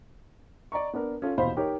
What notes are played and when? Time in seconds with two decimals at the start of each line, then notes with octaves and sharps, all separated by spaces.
0.72 D5 D#5 A#5 C#6
0.93 B3 D4 A#4
1.22 C#4 F4 A4
1.37 D#1 B2 E3 C5 F5 B5
1.56 D#4 G4 A#4 C#5